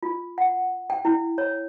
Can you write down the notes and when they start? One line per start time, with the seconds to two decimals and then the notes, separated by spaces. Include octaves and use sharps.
0.03 F4
0.38 F#5
0.90 G5
1.05 E4
1.38 C#5